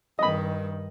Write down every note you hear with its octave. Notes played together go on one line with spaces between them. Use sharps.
G2 D#3 D#5 B5